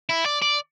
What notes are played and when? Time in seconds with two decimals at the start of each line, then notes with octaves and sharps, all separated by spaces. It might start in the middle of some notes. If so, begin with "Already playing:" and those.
0.09 E4
0.26 D5
0.42 D5